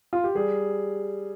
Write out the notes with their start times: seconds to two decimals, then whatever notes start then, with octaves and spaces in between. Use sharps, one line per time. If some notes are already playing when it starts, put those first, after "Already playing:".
0.13 F4
0.24 G4
0.35 G3 G#4